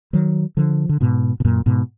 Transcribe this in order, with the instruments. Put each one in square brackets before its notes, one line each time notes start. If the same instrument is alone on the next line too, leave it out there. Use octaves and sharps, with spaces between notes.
[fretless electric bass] D#3 F#3
D3 F3
D3
G#2 B2
B2
F#2 A#2
G#2 B2